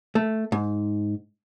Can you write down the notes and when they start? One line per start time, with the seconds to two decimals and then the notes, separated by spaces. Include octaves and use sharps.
0.15 A3
0.52 G#2